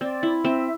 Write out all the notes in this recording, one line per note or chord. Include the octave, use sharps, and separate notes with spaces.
C4 D5
E4
C4 E5